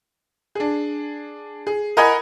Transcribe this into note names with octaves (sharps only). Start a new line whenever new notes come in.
D4 G#4
G#4
A#4 D#5 F#5 G#5 B5 G#6